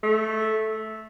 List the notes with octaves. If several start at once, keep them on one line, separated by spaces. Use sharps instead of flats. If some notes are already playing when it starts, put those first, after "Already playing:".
A3